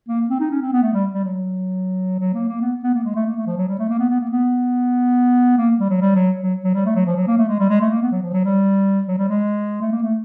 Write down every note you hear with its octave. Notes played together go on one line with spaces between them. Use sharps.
A#3
C4
D#4
C#4
C4
B3
A3
G3
G3
F#3
F#3
A#3
A#3
B3
B3
A#3
G#3
A3
A#3
A3
F3
F#3
G3
A3
A#3
B3
B3
A#3
B3
A#3
G3
F#3
G3
F#3
F#3
F#3
G3
A3
F#3
F3
F#3
A#3
A3
G#3
G3
G#3
A3
A#3
B3
F#3
F3
F#3
G3
F#3
G3
G#3
A3
A#3
A3